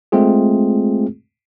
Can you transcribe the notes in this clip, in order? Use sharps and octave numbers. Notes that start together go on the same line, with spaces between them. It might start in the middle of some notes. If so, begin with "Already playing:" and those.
G#3 A3 C4 F4 G#4